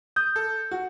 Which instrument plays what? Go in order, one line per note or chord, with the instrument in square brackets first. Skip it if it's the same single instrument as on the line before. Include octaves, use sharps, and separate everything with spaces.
[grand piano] D#6 [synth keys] G6
[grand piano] A4
F#4